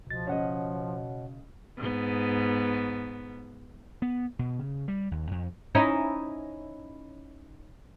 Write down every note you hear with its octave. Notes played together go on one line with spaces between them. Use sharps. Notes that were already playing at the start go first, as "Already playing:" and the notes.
C#2 B2 F3 A6
C#3 C#5 D#5 F#5
G#2 B3
B3
B2
C#3
G3
D#2
F2
C#4 D#4 E4